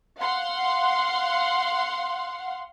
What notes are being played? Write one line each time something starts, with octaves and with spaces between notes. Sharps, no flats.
F5 F#5 C6